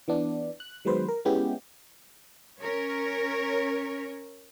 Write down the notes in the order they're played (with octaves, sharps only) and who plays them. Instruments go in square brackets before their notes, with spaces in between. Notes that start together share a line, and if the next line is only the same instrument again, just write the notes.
[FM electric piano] E3 B3 D4
F#6
D#3 F#3 G#3 B3 B4 C5
A#4
G#3 B3 C#4 E4 G4
[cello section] C#4 A#4 C#5